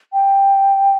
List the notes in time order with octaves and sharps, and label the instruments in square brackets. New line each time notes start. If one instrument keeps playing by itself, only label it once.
[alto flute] G5